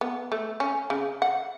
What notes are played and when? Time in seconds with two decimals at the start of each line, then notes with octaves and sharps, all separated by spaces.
0.01 B3
0.32 A3
0.60 C#4
0.90 C#3
1.22 F#5